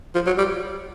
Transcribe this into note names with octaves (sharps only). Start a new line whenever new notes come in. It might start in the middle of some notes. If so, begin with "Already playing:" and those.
F3
F#3
G3